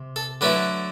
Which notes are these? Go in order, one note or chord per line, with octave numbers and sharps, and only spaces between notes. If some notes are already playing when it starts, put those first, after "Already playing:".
Already playing: C3
A4
D3 F#3 A3 E4 B4